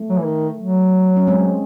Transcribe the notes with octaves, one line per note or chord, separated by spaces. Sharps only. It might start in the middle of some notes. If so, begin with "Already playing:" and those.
Already playing: A3
F#3
E3
D#3
F#3
C#4
G#3 C4